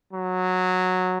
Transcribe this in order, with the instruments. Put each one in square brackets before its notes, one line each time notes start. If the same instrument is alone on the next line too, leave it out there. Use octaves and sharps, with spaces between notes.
[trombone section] F#3